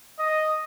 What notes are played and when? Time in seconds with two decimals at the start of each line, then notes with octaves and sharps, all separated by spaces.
0.19 D#5